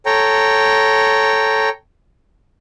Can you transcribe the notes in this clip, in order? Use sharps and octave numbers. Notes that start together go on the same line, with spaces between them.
A4 C#5 G5 A#5